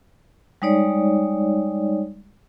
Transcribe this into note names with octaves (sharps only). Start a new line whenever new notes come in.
G3 G#3 D#4 C#5 D5